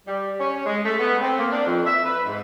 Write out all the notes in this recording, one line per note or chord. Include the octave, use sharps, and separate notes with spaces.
G3
C#4
G#3
A3
B3
C4
A#3
D4
F2
E5
B4
G#2